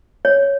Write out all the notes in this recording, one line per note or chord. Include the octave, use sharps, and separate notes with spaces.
C#5